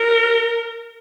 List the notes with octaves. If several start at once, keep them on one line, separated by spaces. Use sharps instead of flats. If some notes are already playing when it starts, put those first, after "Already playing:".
Already playing: A#4